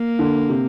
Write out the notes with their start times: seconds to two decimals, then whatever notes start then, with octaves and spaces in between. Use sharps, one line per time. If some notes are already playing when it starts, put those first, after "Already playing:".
Already playing: A#3
0.19 D3
0.49 C3